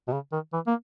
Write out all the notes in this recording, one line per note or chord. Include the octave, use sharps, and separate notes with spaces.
B2
C#3
D#3
E3
A#3